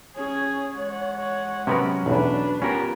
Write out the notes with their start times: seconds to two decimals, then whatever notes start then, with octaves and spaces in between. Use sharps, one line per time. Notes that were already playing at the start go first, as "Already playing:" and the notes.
0.16 C#4 G#4 C#5
0.74 G#3 F#5
1.16 C#5
1.67 C3 F#3 B3 C#4 A#4
2.06 B1 E2 D4 B4
2.62 B3 C#4 F4 G4 A#4